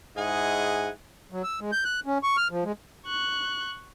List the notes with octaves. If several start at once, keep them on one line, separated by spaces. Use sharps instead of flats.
G#2 E4 G#4 D#5 F#5 G#5
F#3
E6
G#3
G6
F#6
C#4
C#6
F6
F3
G#3
C#6 F#6